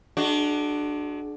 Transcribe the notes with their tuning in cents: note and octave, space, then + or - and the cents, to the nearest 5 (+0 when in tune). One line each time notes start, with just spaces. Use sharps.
G#3 +40 D4 +10 F#4 +0